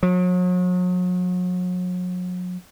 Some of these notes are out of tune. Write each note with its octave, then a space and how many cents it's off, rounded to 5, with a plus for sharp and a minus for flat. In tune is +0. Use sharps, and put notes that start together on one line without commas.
F#3 -40